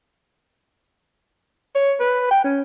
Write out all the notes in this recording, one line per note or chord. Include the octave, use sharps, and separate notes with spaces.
C#5
B4
G5
C#4